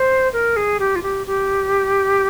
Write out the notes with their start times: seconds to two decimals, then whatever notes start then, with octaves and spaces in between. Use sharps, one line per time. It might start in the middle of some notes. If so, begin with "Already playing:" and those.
Already playing: C5
0.33 A#4
0.56 G#4
0.80 G4
0.96 F4
1.03 G4
1.27 G4